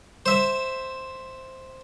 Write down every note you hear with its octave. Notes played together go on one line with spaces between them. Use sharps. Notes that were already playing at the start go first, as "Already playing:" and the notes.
C5 E5